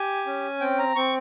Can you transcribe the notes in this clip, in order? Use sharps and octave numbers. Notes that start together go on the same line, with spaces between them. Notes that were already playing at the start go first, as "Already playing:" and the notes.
Already playing: G4 G#5
C#4
C4 G5
A#5
C4 C#6